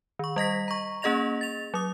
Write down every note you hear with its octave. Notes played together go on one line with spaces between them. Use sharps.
D#3 C#6
G3 D#5 A#6 B6
A#5 C#6
A#3 C#4 G#4 D#5 A#6 F7
A6 F7
F#3 D#6